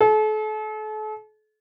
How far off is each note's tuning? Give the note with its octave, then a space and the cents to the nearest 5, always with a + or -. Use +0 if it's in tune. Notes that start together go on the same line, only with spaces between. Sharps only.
A4 -40